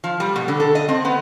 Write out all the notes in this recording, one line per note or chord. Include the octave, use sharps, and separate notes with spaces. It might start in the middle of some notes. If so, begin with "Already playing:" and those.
F3
G3
B2
D3
A4
D#5
C4
B3